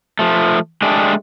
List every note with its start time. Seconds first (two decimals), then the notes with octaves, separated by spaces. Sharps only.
0.19 F3 A3
0.82 G#3 A3 D4 G4 G#4